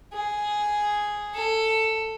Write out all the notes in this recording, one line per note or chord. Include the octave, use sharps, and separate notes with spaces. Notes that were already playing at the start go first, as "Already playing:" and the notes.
G#4
A4